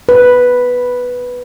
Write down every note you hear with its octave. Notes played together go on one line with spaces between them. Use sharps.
B4